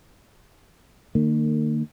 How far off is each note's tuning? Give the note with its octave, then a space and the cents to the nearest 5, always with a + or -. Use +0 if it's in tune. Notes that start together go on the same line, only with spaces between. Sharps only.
D#3 -45 A#3 -35